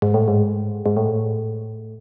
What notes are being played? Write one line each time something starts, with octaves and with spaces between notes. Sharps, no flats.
G#2
A2
G#2
G#2
A2